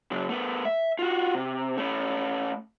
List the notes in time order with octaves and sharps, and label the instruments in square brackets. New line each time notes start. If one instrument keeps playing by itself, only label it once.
[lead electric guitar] C#3 F#3
A3 B3
E5
F4 F#4
C3
A3 C#4